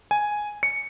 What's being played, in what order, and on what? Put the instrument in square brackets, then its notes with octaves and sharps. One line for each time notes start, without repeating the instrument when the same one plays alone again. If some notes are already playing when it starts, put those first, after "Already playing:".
[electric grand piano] G#5
C#7